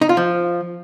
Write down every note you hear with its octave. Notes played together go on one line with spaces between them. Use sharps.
D#4
F4
F3